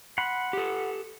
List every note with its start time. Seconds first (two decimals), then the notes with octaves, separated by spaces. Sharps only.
0.18 F#5 B5 C6
0.53 G4 A4